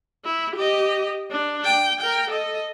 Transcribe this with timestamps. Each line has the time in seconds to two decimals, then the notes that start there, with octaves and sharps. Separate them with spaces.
0.25 E4
0.56 G4 D#5
1.32 D4
1.65 G5
2.01 A#4 G5
2.30 A4 D#5